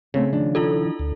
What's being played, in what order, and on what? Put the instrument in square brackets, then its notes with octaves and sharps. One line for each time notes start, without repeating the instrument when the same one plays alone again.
[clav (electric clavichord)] C#3 [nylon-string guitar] A3 C4 C#5
[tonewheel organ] D#3 F3 [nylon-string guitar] D4
[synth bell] E4 F4 A4
[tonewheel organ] D2